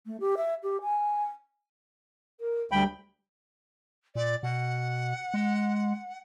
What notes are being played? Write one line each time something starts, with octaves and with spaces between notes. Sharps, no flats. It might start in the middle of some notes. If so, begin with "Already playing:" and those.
A3
G4
E5
G4
G#5
A#4
D2 G3 G5 B5
A#2 D5
B2 F#5
G#3